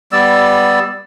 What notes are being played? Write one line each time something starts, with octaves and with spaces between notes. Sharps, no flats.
G3 B3 D5 E6